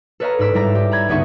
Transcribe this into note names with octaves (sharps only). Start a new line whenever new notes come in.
A4 B4 C#5 D#5 F5 A#5
G#2 D5 B5 E6 B6 D7
G#2 G3 E4 D5 E5 A#5
G4
A#5 B5 G#6
G1 C#2 B3 D#4 E5 C#6